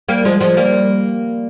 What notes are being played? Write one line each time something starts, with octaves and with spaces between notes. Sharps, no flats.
G3 A#3
F3 G#3
F3 G#3
G3 A#3